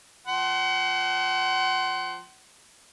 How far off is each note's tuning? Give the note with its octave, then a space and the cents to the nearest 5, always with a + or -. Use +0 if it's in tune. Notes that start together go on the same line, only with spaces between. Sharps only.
F3 +0 F#5 +35 C6 +0